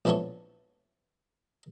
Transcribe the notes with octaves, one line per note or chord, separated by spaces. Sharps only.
A#1 E3 F3 B3 A4 C#5